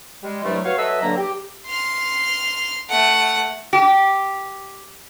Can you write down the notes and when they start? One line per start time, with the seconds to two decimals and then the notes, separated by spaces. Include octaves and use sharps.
0.22 G3 G#3
0.43 C2 G2 F#3 G3 A3
0.63 F#4 B4 C#5 F5 C#6
0.77 F#3 A4 B4 D#5 E5 E6
1.01 G2 D3 F#3 A#3 A4 A#5
1.16 G4
1.66 C6 F6
2.89 A3 F#5
3.73 G4